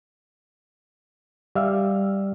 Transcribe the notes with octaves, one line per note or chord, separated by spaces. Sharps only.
G3 E5 F5